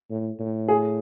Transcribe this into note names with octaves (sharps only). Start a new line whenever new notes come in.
A2
A2
G#4